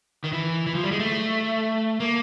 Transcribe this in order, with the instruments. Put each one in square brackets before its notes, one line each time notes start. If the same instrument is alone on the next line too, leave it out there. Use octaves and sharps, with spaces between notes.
[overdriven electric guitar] D#3
E3
E3
F3
G3
G#3
A3
A#3